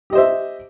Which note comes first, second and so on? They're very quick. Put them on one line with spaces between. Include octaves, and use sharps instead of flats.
G4 D#5 C5 E5